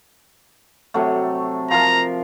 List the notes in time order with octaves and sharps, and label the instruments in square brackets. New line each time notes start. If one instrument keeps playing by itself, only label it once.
[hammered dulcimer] C3 F#3 A3
[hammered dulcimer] F3 A#4 [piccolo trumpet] A#5